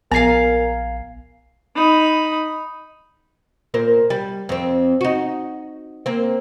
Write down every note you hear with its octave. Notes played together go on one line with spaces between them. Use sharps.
A#1 B3 A#4 F5 G#5 A#5 C7
D#4 B5
A#2 A#4 C5
G3
F2 C4
D#4 F#4
A#3 C4